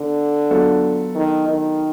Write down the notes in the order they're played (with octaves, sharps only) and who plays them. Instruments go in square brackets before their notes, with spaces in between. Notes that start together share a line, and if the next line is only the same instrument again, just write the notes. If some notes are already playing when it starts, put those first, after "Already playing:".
Already playing: [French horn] D3 [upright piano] B3
[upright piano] F#3 B3 D4 F4 A4
[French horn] D#3
D#3